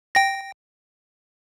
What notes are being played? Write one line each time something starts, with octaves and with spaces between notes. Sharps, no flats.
G5 A#6